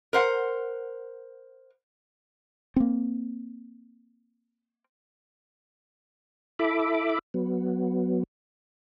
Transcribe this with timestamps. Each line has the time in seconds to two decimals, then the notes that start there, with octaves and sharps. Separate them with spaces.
0.13 A#4 C5 F#5
2.76 A#3 C4
6.59 E4 A4 E5 B5 D6
7.34 F#3 B3